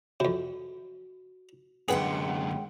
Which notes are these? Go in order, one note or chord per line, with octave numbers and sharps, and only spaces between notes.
F2 C3 F#4
F#2 D3 G#3 G#4 B4 F#5 G5